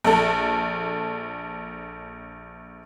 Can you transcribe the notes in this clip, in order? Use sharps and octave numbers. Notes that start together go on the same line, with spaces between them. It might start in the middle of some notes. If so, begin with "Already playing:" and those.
A#1 A4